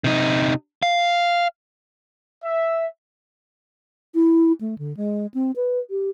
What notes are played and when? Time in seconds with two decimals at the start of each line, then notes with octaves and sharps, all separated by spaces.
0.04 C3 D#4
0.83 F5
2.44 E5
4.15 E4
4.61 A3
4.78 D3
4.97 G#3
5.34 C4
5.56 B4
5.90 G4